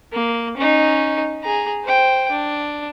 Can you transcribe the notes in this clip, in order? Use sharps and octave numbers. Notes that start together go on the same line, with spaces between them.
A#3
C#4 D#4
G#4 A#5
C5 G5
D4